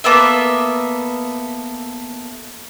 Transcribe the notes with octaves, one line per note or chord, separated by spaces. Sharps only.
A#3 B3 A4 E5